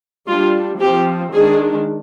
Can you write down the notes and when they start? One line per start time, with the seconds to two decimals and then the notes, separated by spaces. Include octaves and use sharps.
0.28 G3 D4 F4
0.80 F3 C4 G4
1.33 D#3 G#3 D4 G#4